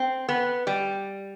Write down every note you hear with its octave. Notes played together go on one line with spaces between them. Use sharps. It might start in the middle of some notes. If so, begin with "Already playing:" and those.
Already playing: C4
B3
G3